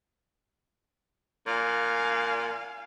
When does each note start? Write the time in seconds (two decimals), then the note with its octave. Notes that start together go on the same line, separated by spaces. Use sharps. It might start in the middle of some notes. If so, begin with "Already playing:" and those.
1.47 A#2 F5 G#5